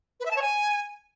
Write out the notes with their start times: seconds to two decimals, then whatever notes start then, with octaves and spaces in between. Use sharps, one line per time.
0.20 B4
0.26 E5
0.31 A5
0.36 C#5
0.42 G#5